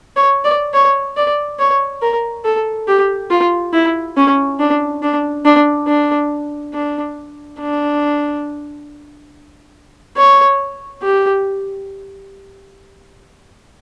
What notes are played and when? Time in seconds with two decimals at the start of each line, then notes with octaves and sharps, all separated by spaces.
0.16 C#5
0.44 D5
0.73 C#5
1.17 D5
1.59 C#5
2.02 A#4
2.45 A4
2.88 G4
3.30 F4
3.73 E4
4.17 C#4
4.59 D4
5.02 D4
5.45 D4
5.87 D4
6.74 D4
7.60 D4
10.17 C#5
11.02 G4